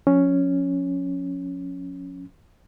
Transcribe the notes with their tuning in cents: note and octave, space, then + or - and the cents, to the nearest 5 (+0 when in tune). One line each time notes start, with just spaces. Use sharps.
F3 +45 C#4 +0